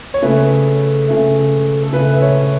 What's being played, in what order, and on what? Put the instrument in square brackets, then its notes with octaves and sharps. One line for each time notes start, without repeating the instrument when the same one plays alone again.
[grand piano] C#5
C#3 A3 B4
C#3 A3
A4
C#3 A3 B4
E5
C#5